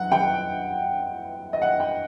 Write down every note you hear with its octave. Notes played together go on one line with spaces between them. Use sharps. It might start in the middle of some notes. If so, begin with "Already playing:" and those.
Already playing: F#3 F#5
G5
D#5
F#5
G5